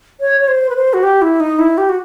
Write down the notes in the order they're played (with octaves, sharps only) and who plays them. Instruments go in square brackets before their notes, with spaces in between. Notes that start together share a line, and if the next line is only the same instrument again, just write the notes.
[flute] C#5
C#5
C5
B4
C5
F#4
G4
E4
D#4
E4
G4
F#4